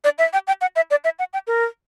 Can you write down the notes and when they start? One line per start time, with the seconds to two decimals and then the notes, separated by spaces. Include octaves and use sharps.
0.04 D5
0.18 E5
0.33 G5
0.47 G5
0.61 F#5
0.76 E5
0.91 D5
1.04 E5
1.19 F#5
1.33 G5
1.47 A#4